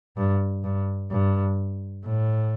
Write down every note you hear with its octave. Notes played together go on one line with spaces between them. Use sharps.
G2
G2
G2
A2